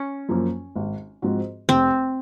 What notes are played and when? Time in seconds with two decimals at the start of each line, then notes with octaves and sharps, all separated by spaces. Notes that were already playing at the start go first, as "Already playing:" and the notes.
Already playing: C#4
0.29 F#2 F3 A#3
0.76 G#1
1.22 G#2 F3 C4 F#4
1.69 F1 C4